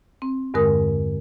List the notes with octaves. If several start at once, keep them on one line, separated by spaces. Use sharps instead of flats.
C4
E2 G2 D3 G#3 A#4 D#6